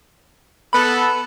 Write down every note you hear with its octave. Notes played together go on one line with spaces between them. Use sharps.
B3 A4 B5